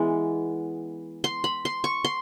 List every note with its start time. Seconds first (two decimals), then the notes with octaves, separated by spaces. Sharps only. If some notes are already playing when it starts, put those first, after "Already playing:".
Already playing: E3 G#3 B3
1.24 C6
1.44 B5
1.65 C6
1.84 C#6
2.05 C6